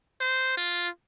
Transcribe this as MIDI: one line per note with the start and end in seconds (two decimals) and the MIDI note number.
0.21 0.56 72
0.57 0.88 65